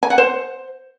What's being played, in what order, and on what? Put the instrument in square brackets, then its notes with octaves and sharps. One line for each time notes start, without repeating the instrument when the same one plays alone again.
[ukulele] G#5
F#5
C5